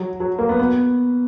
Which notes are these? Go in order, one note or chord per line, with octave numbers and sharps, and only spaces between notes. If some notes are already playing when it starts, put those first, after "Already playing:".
Already playing: F#3
F#3
A#3
B3
B3